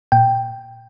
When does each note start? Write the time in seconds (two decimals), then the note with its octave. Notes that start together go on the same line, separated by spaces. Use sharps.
0.12 A#2 G5